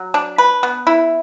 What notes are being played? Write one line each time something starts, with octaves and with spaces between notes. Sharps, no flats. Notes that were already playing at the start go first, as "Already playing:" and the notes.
Already playing: F#3
D4
B4
B3
E4